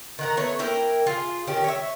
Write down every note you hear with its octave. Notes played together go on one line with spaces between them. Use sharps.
D#3 F#5 A#5
A3 B3 C#5
A#3 E4 A#4 G5
F4 G#4
D#3 C#4 G4
C#5 E5